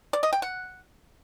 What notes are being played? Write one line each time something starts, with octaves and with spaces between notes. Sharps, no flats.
D5
D#5
G5
F#5